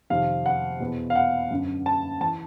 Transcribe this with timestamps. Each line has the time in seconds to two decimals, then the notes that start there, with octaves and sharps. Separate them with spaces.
0.10 F2 C3 D#3 F5
0.46 F#5
0.80 E2 B2
1.10 F5
1.15 F#5
1.51 F#2 D3
1.86 A5
2.21 E3 A5